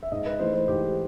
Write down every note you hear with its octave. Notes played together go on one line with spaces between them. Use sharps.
E5
G#2 D#5
B4
E3 A3 C5
C5
G#2 G4